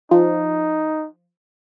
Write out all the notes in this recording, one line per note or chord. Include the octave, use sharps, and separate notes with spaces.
F3 D#4